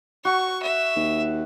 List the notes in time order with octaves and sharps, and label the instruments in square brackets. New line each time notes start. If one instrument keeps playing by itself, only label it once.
[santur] F#4 [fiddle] C#6
[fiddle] E5
[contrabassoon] D#2